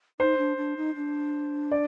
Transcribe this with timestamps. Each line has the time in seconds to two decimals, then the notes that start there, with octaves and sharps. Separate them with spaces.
0.20 D#4 C5
0.38 D4
0.57 D4
0.77 D#4
0.96 D4
1.71 D5